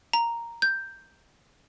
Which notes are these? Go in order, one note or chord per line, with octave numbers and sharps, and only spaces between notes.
A#5
G6